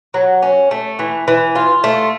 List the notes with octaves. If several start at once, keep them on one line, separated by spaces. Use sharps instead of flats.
F#3
C#4
A3
E3
E3
F4
A3